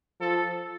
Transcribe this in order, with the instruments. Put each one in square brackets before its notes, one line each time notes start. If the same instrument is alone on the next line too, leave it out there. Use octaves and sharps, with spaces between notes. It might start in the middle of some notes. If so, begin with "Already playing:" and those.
[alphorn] F3 [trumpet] A4